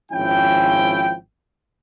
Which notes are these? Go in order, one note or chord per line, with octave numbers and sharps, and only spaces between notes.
G#1 F3 C#4 E4 G5